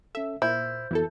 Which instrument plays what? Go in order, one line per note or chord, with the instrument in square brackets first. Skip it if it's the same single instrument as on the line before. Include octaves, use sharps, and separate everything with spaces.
[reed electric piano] C#4 A4 [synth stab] E5
[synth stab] A#2 [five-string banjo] E4 [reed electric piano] C5 [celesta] G6
[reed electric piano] F2 B3 F#4 [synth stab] E3 E4 A4